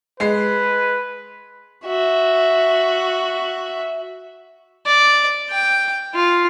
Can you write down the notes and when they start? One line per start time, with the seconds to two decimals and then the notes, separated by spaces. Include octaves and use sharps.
0.20 G#3 B4 C7
1.86 F#4 E5
4.86 D5
5.51 G5
6.15 F4